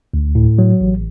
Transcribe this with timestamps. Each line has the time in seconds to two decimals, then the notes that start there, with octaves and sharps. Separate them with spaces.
0.14 D2
0.35 A2
0.59 F#3
0.81 A1